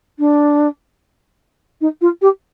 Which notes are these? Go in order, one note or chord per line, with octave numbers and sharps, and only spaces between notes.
D4
D#4
F4
G4